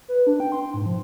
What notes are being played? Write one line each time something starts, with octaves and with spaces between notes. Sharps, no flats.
B4
D4
G5
C6
G#2
F3